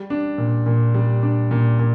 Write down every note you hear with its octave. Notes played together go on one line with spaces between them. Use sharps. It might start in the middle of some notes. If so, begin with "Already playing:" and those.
Already playing: G3
D4
A#2
A#2
G3
D4
A#2
A#2